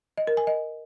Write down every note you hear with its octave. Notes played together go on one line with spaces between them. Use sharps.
D#5
A#4
G#5
D#5